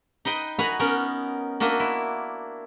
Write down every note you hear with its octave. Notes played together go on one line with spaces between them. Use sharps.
D#4 B4 D#5 G5
F#4 B4 G#5 A#5 B5
B3 C#4 D#4 A#4
A#3 D4 F#4 D#5 E5
E4